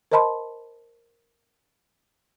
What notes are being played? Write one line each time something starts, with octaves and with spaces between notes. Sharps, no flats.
A#4 C5 D#5 A5 B5 C6